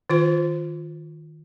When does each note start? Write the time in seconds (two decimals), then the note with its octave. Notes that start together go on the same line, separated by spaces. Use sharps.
0.10 D#3 F4 C5